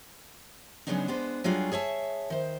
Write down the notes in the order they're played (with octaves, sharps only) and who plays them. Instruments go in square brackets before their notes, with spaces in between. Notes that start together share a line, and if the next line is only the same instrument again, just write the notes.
[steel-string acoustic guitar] C#3 F#3 G#3 B3 D4 D#4
G#3 B3 D4 C5
F#3 G3 D4 F4 F#4 G#4
G#4 C#5 E5 A5
D#3 C5